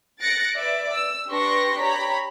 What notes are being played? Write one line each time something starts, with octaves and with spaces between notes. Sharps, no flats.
F#6 A6 A#6 C#7 D7
B4 D5 E5
E6
D4 G4 B4 C6 C#6 A#6
G4 C#5 A#5 B5 B6